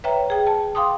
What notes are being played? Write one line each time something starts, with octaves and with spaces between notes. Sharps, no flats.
B4 C#5 E5 G5 A#5
G#4 G5
A5
F5 G5 C6 D6 D#6